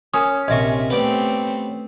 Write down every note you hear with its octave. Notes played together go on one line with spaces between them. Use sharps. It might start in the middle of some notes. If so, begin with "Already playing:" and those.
C#4 A#4 D#6
A#1 C3 D#5 E5 C#6
A3 B3 C4 G4 D5